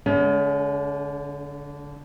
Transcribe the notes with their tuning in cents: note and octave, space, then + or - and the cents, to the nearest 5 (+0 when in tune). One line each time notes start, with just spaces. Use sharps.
D3 -15 G#3 +25 C#4 +40